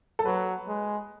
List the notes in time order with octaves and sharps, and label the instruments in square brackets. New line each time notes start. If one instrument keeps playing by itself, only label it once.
[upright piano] A4
[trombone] F#3 [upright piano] B4
[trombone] G#3